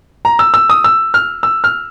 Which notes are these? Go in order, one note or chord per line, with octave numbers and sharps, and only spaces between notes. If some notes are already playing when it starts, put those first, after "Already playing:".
A#5
E6
E6
D#6
E6
F6
E6
F6